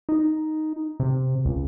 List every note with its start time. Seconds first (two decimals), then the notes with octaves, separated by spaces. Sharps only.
0.09 D#4
1.00 C3
1.45 C#2